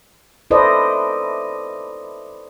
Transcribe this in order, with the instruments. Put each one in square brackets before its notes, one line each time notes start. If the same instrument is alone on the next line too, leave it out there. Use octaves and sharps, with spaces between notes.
[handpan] E4 A4 B4 C5 D5 D#5